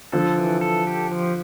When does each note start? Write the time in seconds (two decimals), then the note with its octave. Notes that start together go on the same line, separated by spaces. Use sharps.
0.12 D3 F3 A4
0.38 E3
0.61 A4
0.87 G4
1.12 F3